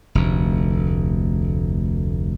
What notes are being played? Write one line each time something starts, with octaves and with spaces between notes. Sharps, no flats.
F1 D2